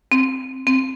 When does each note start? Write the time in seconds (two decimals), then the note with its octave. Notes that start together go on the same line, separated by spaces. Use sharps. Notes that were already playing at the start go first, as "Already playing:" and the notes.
0.12 C4
0.67 C4